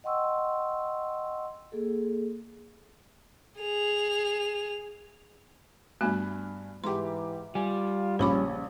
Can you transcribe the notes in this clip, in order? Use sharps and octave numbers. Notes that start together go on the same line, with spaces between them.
D#5 F#5 G5 C6 C#6 E6
A#3 G#4 A4
G#4 F7
G2 A3 B3 F#4 G#5 B5
G#2 E3 G4 C6 D6
G3 F4 G#5
A#1 C#3 C#4 C5 B5 D6